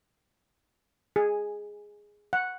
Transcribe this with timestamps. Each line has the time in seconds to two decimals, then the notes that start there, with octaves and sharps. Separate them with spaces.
1.16 G#4
2.33 F#5